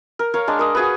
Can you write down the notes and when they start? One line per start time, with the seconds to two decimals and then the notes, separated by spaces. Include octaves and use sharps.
0.19 A#4
0.34 A#4 C#5 F5
0.48 G#3 D4
0.59 A#4 D#5
0.75 F#4 G#4 B4